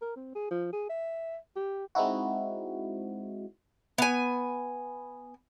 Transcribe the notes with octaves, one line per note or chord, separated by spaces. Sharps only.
A#4
C4
G#4
F3
G#4
E5
G4
G#3 C4 D#4 E4 F#4
B3 G#5